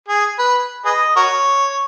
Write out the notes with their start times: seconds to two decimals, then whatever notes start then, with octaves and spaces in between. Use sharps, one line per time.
0.08 G#4
0.39 B4
0.85 G#4 B4 D#5
1.16 F#4 A#4 C#5